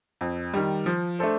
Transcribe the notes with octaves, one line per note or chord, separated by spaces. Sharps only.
F2
D#3 G3
F3
A3 D4 A4 C5